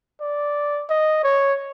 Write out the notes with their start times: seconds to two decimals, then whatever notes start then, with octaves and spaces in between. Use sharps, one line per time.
0.21 D5
0.90 D#5
1.23 C#5